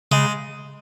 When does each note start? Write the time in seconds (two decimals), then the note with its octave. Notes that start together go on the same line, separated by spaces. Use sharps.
0.11 C#3 G#3